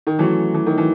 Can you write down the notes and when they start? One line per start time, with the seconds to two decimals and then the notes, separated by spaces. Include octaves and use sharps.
0.07 D#3
0.19 E3 F#3 A3 C#4 F#4
0.54 E3
0.66 D#3
0.78 E3